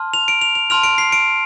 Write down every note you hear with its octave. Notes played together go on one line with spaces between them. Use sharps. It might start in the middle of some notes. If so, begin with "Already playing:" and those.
Already playing: A5 C6 F6
F7
D7
F7
F7
A5 C6 F6 F7
D7
C7
D7